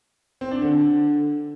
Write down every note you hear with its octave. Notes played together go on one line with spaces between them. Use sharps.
C4
D4
D3